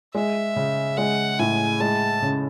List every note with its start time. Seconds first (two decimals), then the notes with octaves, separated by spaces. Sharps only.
0.15 G#3 E5
0.56 C#3
0.97 G#3 F#5
1.39 A2 G#5
1.80 G#3 A5
2.22 C#3